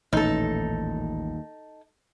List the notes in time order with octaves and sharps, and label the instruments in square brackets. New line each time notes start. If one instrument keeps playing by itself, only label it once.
[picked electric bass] D#1 A#2 D#3 [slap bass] A1 [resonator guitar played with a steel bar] D#4 A4